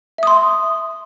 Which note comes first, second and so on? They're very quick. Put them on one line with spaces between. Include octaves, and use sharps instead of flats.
E5 D#6 C6